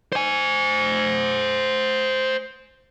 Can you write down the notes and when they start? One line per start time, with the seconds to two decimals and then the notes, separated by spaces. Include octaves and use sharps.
0.12 C5 G#5